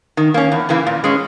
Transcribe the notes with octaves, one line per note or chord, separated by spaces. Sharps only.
D#3
A#3 C#4
E2
C#3 E3 A#3
A#2
G#3 C#4